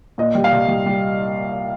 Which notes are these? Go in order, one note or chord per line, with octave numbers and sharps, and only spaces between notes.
A#2 D#5
G3
F5
C2
G3
G3